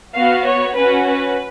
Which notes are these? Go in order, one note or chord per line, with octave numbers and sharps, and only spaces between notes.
B3 F#4 F5
C#5
C#4 F#4 B4
B4